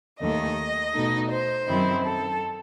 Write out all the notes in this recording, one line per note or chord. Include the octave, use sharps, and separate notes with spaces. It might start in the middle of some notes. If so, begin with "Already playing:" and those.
D#2 D#3 A3 D#4 D#5
B2 A3 D#4
C5
F#2 D#3 F#3 C4 E4
A4